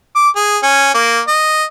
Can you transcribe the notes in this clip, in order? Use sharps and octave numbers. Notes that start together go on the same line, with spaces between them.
D6
G#4
C#4
A#3
D#5